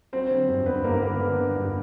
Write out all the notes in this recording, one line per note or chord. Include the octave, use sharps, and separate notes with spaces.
F#3 C4 C5
D3
G2
G2 B3 B4
G2 A#3 A#4
D3 B3 B4
D3
D3
G2